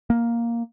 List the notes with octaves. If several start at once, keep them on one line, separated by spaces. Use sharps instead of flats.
A#3